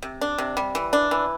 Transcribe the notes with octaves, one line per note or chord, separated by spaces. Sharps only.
C3
D4
C3
G3
E3
D4
E3